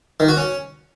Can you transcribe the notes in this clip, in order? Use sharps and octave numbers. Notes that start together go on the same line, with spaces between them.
D#3
F#4
C#4